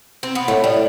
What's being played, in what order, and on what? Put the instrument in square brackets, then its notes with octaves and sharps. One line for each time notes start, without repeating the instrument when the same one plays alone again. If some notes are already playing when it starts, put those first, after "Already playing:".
[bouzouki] C4
B3
[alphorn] A2 [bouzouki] A3
[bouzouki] G3